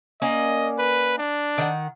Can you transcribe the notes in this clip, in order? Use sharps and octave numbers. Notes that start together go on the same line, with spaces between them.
A#3 C#4 D5 D#5
B4
D4
D#3 B4 F#5